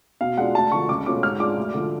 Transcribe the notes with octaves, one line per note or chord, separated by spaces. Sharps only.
B2 F5
G#3 D4 F4 F#5
D2 A5
D3 F3 C#6
C#2 D6
B2 A3 C#4 F4 D6
G#2 F6
G#3 D4 F4 D6
D2
D3 F3